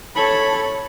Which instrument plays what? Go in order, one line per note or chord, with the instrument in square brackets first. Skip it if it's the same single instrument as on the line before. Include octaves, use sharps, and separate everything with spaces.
[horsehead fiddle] A4 C#5 [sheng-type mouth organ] B5